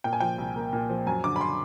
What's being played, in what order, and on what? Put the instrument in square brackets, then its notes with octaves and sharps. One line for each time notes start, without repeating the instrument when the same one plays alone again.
[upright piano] A#2 G5
G#5
F3 G5
C2
A#3
A#2
F3
F#2 G#5
D3 D6
B5
C6